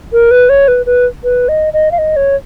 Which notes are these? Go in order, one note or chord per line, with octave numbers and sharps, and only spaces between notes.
A#4
B4
C#5
B4
B4
B4
D#5
D#5
F5
D#5
C#5